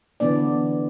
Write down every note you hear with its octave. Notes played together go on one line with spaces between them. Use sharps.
D3 E3 B3 D4 D5